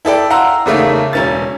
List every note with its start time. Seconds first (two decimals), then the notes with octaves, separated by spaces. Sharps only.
0.05 E4 A4 D5 G5
0.30 F5 F#5 A#5 C6 E6
0.66 E2 C#3 A3 A#3 D#4
1.13 E1 C#4 A6